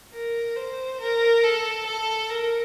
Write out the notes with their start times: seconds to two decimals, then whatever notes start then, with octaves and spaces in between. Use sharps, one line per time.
0.14 A#4
0.57 C5
1.01 A#4
1.43 A4
1.86 A4
2.30 A#4